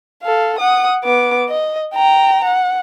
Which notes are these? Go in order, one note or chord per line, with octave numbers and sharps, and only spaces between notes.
A4 F5
F#5 D#6
B3 D6
D#5
G5 A#5
F#5